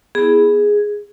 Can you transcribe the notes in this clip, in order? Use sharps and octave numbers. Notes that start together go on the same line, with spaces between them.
B3 E4 G#4